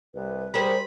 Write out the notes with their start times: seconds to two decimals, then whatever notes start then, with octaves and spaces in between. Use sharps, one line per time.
0.14 C2 B4
0.54 G3 G#4 A#4 C5 B5